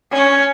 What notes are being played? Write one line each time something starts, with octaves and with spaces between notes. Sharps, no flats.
C#4